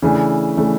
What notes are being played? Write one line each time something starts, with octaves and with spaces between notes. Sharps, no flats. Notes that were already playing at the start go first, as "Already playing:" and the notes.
C#3 E3 A3 D4
C#3 E3 A3 D4